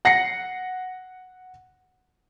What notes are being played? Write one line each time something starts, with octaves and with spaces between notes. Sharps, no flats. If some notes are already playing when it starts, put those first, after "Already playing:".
F#5 A#6 C7 C#7